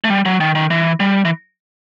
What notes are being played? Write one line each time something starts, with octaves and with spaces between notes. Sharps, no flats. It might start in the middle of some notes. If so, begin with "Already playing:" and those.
A3
G3
F#3
D#3
D#3
E3
G3
E3